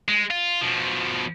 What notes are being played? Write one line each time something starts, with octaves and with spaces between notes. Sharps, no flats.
G#3
F4
B2 F3